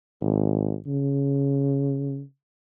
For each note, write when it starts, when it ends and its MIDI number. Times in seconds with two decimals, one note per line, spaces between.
0.21 0.75 32
0.87 2.21 49